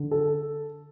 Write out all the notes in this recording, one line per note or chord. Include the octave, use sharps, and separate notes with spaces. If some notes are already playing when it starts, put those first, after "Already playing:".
Already playing: D3
A4